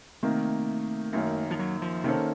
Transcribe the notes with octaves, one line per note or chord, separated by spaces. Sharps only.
C3 D#3 A3 A#3
F#2 D#3 A#3 C#4
F3
F#3
F3
C3 D#3 A#3 C#4 A4 C5